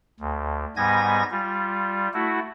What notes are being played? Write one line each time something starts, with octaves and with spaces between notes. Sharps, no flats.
D2
G#2 G3 B3 G#5 G#6 A#6
G3 F4
A3 E4 F#4